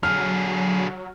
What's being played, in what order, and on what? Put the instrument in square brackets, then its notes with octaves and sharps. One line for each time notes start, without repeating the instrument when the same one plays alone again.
[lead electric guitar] D3 G#4 [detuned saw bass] F#3 [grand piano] F6